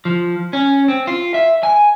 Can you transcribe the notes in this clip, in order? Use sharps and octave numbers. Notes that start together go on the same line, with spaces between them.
F3
C#4
C4
F4
E5
G#5